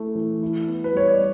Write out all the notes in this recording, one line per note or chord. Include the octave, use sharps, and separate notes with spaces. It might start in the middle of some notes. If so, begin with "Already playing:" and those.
Already playing: A3 E4
E3
E4
B3
B4
G3 C#5
D5